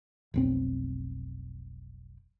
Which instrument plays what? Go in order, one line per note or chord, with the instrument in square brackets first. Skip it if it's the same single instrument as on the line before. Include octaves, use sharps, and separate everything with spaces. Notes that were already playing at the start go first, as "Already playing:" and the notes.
[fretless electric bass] F1 B1 C4